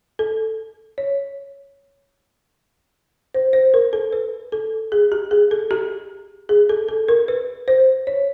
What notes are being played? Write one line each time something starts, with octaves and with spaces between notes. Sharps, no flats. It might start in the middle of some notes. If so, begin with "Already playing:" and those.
A4
C#5
C5
C5
A#4
A4
B4
A4
G#4
G4
G#4
A4
G4
G#4
A4
A4
A#4
B4
C5
C#5